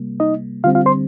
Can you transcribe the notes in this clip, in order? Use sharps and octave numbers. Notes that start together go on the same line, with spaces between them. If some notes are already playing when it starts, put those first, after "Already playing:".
Already playing: C3 G3 A#3
D#4 D#5
D3 G3 C4 F4 F5
F4 F5
C5 C6